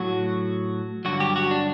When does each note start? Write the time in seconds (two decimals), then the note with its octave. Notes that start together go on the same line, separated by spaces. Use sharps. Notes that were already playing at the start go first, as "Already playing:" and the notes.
Already playing: A2 F#3 F#4
1.05 G2 D3 F#3 F#4
1.20 G4
1.36 F#4
1.51 D4